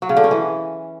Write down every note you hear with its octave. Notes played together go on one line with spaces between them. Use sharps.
F#3
C#3
D3
C#4
E3